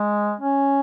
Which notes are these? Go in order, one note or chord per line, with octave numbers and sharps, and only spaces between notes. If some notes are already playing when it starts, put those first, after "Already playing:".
Already playing: G#3
C#4